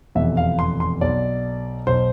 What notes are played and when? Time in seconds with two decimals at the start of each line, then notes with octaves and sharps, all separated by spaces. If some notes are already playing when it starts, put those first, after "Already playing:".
0.15 F1 E2 B2 E5
0.37 F5
0.59 C6
0.80 C6
1.01 B1 B2 D5
1.87 B1 B2 C5